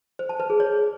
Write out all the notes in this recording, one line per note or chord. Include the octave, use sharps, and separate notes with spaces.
C5
A5
B4
G#4
C#5